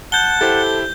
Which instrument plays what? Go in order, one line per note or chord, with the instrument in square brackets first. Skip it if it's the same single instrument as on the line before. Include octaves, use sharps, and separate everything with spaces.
[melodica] F#5 A5 [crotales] G6 G7
[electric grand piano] E4 G4 C5 [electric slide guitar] A4